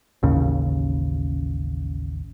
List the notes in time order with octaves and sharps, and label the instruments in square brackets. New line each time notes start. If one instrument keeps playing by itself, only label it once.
[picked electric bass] A1 D#2 C#3